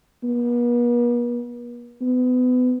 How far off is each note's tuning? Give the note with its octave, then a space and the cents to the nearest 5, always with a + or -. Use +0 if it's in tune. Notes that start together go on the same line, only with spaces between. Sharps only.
B3 -45
B3 +30